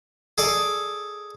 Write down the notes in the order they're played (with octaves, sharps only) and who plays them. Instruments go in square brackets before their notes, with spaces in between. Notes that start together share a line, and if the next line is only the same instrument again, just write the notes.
[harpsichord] G#4 A4 D5